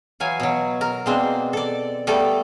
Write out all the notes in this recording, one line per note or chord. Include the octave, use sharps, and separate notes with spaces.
E3 F#3 F5 G#5
B2 F#3
A#4
B2 G#3 A#3 C4 D4 C5
A4 D5
G3 A3 B3 A4